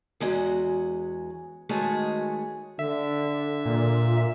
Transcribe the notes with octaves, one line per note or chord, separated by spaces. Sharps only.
E2 G#3 C#4 F#4
D#3 G#3 A3 F#4 G#4 C#5
D3 E5
A#2